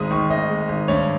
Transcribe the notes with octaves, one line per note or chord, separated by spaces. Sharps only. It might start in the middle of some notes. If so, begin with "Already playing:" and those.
Already playing: G#1 G#3 D#6
D#3 C#6
G#1 D#5
G#3
G#1
G2 C#5